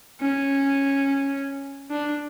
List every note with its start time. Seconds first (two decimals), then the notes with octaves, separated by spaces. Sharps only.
0.21 C#4
1.91 D4